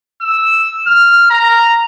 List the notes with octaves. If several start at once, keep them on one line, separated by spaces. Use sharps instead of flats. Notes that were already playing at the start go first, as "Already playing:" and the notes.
E6
F6
A#5